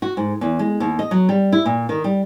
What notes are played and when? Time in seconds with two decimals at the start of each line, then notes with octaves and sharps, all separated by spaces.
0.02 F#4
0.17 G#2
0.41 E2
0.59 G#3
0.80 D#2
0.99 D#5
1.11 F#3
1.29 G3
1.52 E4
1.66 A#2
1.89 D#3
2.04 G3